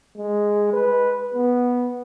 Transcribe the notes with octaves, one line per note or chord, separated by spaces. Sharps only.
G#3
B4
B3